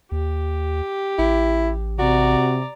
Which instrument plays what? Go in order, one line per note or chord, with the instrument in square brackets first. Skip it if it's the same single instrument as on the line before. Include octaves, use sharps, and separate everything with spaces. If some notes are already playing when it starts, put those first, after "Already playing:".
[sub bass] D#2 [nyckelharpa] G4
[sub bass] A1 [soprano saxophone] E4
[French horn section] C3 [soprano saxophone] F#4 [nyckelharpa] D5 A#5